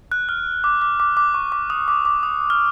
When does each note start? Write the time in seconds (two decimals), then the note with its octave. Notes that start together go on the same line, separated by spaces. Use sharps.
0.12 F#6
0.29 F6
0.64 D6
0.82 D6
1.00 D6
1.17 D6
1.34 C#6
1.52 D6
1.70 D#6
1.88 D6
2.05 D6
2.23 D#6
2.50 F6